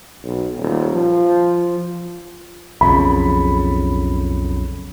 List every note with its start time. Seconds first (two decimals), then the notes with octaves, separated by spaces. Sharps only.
0.24 B1
0.57 D#1
0.93 F3
2.81 B1 F2 C#3 B5